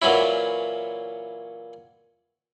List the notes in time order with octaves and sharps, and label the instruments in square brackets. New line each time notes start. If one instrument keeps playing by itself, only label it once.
[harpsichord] A#2 E3 F#3 C#4 E4